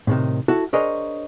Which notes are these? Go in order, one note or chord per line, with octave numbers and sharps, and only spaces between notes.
A2 C3 D#3
E4 F#4 A4
D4 G#4 A#4 C5 C#5 D#5